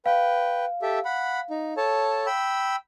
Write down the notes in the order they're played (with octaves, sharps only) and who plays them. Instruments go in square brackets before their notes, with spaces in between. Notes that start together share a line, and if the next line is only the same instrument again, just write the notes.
[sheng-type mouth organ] B4 G5 [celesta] F5
[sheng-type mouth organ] G4 A4 E5
F#5 B5
D#4
A4 C#5 A5
G5 B5 E6